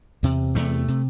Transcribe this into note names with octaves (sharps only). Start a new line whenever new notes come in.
E2 C3
E2 C3 A3
C3